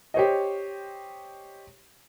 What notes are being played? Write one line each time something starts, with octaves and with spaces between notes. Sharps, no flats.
G4 C5 C#5 D#5